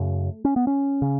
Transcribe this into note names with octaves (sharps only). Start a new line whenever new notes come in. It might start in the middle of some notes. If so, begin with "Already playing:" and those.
Already playing: F#2 C#3 A3
C#4
B3
C#4
C#3